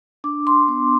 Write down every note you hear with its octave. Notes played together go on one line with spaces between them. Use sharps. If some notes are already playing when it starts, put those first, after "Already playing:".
D4 D6
C6
B3 D6